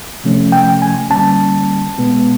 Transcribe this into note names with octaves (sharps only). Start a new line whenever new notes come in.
C3 F3 A3 C#4
G5
G#5
D3 G3 A#3 C#4 A5
B2 G#3 B3